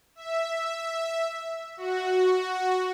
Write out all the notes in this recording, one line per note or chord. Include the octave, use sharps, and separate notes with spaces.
E5
F#4